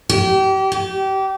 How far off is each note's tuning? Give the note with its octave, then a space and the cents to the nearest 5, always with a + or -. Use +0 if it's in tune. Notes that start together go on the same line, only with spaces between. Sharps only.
G4 -30
G4 -25